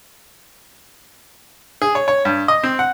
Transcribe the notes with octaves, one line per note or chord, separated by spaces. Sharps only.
G#4
C#5
C#5
G2
D#5
C4
F#5